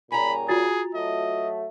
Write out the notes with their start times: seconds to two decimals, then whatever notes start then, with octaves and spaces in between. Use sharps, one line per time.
0.12 A#2 C#3 G3 G#5 A#5 B5
0.48 F4 F#4 G#4 A6
0.95 F#3 A3 D#5